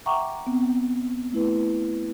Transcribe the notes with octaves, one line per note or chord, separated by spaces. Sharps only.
E5 F#5 G5 A#5 C#6 D6
B3 C4
A3 E4 B4